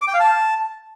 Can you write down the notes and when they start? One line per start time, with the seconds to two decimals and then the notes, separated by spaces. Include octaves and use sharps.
0.02 D6
0.08 G5
0.14 F5
0.20 A5